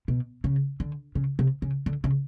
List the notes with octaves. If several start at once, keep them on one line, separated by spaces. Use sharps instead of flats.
B2
C#3
D3
C#3
C3
C#3
D3
C#3